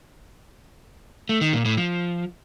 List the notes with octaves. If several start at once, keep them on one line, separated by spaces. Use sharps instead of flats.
A3
D#3
A#2
A2
F3